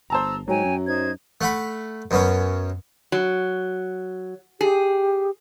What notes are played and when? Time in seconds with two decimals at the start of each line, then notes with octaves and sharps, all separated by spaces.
0.10 G1 C5 A5 A#5 E6
0.48 G#2 F#3 C#5 G5 G#5
0.64 F#2
0.86 D#4 C5 G#6
1.41 A3 F#5 B5
2.11 F#2 B3 C#4
3.12 F#3
4.61 G4 G#4